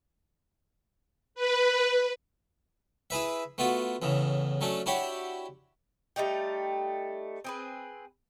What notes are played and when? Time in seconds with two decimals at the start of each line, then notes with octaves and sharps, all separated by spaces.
1.35 B4
3.10 E4 G#4 B4 E5
3.58 A3 B3 F4 F#4
4.02 E2 A2 C#3
4.61 F#3 A3 C#4 D4
4.86 D4 E4 F#4 G4 C#5
6.16 G3 A3 D#4 G5
7.44 C4 G#4 B4